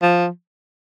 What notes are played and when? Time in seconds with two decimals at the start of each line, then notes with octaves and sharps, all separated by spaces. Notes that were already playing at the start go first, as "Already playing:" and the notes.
0.02 F3